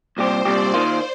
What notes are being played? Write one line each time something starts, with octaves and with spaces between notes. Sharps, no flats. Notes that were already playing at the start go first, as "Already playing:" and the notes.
C2 A#2 G3 C4 G4 C5
C2 A#2 G3 C4 G4 D5
D#3 A#3 F4 C5